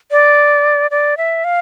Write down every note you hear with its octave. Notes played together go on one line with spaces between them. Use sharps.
D5
D5
E5
F5